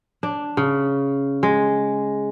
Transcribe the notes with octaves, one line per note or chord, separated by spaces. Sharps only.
D4
C#3
G#3